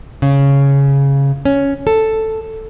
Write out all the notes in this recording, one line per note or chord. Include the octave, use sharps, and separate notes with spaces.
C#3
C#4
A4